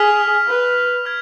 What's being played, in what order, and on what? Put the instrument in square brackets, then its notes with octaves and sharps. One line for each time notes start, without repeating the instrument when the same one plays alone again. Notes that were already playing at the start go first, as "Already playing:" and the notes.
Already playing: [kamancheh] G#4 [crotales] F6 B6 F7
[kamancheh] B4
[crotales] F6 G#6